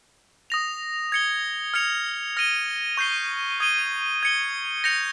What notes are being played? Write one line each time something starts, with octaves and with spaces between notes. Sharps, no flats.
D#6 A#6 F7
G#6 C#7 G7
F6 G#6 C#7 F7
F6 A#6 D#7 G7
C#6 G6 C7 G7
D#6 G#6 D#7 G7
G#6 C#7 G7
G6 A#6 C#7 F7